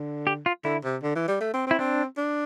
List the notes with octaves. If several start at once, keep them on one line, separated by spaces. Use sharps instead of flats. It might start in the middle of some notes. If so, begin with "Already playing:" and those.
Already playing: D3
G4
F4
D3 E4
C3
D3
E3
G3
A3
C4
C4
E4
C4 D4
D4